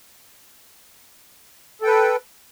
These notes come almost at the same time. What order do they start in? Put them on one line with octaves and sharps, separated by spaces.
A4 G5 B4